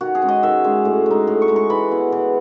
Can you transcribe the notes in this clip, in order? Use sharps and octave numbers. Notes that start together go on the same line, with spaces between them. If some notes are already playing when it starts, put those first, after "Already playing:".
D#3 F#4
G#4
G#3 C#4
D#5
D#3 E5
G#3 C#4
A2
G#3 D#4
A2
C#6
G#3 D#4
C#6
E3 B5
B3 E4
E3